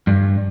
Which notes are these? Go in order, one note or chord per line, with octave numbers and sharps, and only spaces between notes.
G2